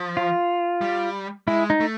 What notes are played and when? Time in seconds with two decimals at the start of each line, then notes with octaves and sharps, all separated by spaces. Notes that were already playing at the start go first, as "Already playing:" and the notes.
Already playing: F3
0.17 F4
0.81 G3
1.47 G#3 E4
1.70 D#4
1.80 A3